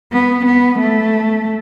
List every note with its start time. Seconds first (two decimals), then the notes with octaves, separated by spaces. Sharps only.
0.13 B3
0.46 B3
0.79 A3